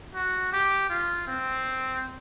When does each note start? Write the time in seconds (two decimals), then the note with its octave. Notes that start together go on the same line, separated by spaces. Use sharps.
0.15 F#4
0.53 G4
0.90 F4
1.27 C4